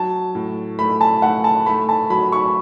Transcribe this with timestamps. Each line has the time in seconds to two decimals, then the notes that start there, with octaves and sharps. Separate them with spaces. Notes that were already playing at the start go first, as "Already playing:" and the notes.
Already playing: F#3 A5
0.35 A2
0.79 A3 B5
1.01 A5
1.22 A3 F#5
1.44 A5
1.66 A3 B5
1.89 A5
2.10 F#3 B5
2.32 C#6